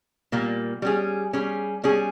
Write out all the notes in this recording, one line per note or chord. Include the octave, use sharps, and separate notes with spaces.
A#2 G3 A#3
G3 C#4 G#4
G3 C#4 G#4
G3 C#4 G#4